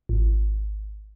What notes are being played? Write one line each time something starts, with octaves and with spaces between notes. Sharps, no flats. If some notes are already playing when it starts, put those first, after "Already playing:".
G#1